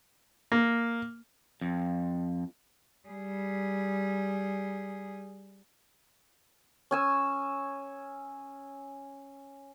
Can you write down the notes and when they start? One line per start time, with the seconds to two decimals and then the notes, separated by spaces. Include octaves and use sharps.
0.52 A#3
1.61 F2
3.08 G3 G#4
6.91 C#4 G#5 E6